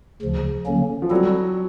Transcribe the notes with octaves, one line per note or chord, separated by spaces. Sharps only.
D2 C#3 F3
D3 F#3 A#3 C#4
F3
F#3 G3 C4 E4 A4